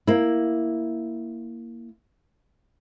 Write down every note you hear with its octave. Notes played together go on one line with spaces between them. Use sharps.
A#3 E4